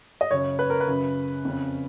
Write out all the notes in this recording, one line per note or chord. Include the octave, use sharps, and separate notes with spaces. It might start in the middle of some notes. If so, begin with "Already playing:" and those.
D#5
F#2 C#3 C#5
B4
A#4
B4
F#2 C#3
F2 C#3